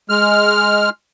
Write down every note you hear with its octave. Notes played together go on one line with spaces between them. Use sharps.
G#3 F6